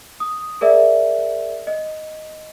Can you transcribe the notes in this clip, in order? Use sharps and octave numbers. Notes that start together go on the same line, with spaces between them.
D#6
G#4 A#4 D5 E5
D#5